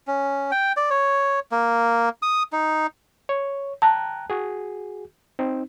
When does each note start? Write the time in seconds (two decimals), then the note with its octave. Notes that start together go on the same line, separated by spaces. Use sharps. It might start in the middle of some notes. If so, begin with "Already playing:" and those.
0.07 C#4
0.52 G5
0.77 D5
0.90 C#5
1.52 A#3
2.22 D#6
2.52 D#4
3.29 C#5
3.82 G5 A5 A#5 F#6
4.30 F#4 G#4
5.39 C4 D#4